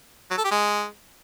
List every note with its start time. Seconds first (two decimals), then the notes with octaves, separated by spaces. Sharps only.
0.31 F#3
0.38 A4
0.45 G4
0.51 G#3